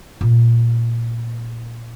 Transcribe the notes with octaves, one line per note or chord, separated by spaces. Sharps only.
A#2